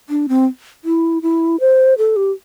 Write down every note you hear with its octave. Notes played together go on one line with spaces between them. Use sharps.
D4
C4
E4
E4
C5
A4
G4